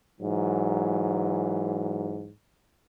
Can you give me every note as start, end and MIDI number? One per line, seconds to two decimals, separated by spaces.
0.20 2.31 44
0.20 2.31 52
0.20 2.31 54